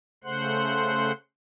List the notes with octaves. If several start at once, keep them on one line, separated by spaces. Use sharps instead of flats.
C#3 A3 C5 F#5 C6 F#6